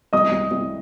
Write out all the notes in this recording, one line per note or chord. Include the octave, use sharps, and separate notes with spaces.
C2 D#5 D#6
C2
C2